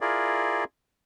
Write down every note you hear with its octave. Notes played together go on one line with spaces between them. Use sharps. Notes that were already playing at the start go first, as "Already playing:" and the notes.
E4 F4 G#4 A#4 D5